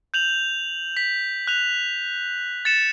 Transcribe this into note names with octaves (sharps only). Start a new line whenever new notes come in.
G6 F7 F#7
B6
F#6 F7
A6 C#7 E7